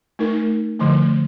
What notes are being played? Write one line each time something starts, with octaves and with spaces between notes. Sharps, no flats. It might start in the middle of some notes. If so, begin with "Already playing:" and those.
A3 D#4 A#4
D3 F3 A3